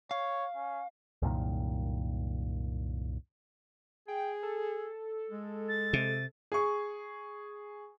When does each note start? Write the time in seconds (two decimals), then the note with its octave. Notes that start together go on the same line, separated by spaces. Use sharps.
0.11 C#5 F5
0.56 C#4
1.22 C2 F#2 A#2 D#3
4.08 G#4 G5
4.43 A4
5.30 G#3
5.68 A6
5.93 C3
6.52 G#4 C#6